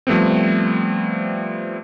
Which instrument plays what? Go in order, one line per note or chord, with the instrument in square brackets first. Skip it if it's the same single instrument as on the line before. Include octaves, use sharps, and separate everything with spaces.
[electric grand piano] F3 G3 A3 B3 C4